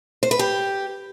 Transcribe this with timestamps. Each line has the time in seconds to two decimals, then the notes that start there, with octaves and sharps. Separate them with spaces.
0.23 C5
0.31 B4
0.39 G4